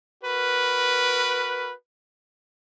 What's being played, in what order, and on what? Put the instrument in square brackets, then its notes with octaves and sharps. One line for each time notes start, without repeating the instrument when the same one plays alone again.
[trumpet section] F#4 A#4 B4